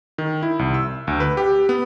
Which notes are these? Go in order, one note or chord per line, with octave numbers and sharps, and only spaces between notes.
D#3
E4
C2
E6
D2
B4
G4
B3